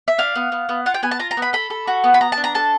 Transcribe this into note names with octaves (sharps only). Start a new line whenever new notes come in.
E5
D4 F5
B3
B3
B3
F4 F#5
G5
B3 G#5
A5
F4 A#5
A#5
B3
B5
A4 B5
A4
F#4
B3
B5
B3 A#5
A5
D4
A#5
A4 A5